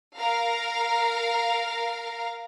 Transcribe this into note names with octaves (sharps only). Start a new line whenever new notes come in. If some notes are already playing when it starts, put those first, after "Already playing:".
A#4 F5 A#5